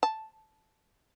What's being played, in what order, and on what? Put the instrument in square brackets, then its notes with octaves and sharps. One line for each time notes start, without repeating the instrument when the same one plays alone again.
[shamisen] A5